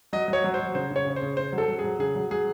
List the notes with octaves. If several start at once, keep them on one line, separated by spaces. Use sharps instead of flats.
F#3 D#5
F#3
C#5
F#3
C5
F#3
C#3 C5
C#3
C#5
C#3
C5
C#3
C#3 C5
F#3
A4
F#3
G#4
F#3
C#3 G#4
F#3
F#3 G#4